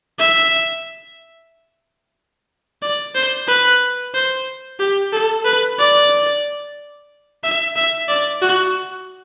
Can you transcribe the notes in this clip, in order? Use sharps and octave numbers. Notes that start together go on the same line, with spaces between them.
E5
D5
C5
B4
C5
G4
A4
B4
D5
E5
E5
D5
F#4